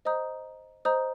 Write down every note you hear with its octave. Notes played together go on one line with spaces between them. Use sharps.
C5 D#5 A#5 D#6 G6
C5 D#5 A#5 D#6 G6